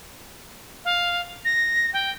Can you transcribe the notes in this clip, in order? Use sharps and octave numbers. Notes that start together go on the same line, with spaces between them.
F5
A#6
G5